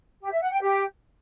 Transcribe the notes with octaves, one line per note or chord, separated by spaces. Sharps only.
G4
E5
F#5
G5
G4